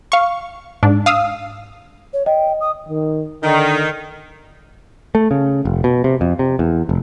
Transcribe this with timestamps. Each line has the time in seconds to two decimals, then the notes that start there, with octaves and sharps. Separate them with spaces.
0.12 F5 C#6
0.83 G#2 D4
1.06 F5 D#6 E6
2.13 C#5
2.26 D#5 G5
2.61 D#6
2.89 D#3
3.44 D3 D#3
5.15 A3
5.31 C#3
5.65 F1
5.84 B2
6.04 C3
6.21 F2
6.39 C3
6.59 E2
6.89 F1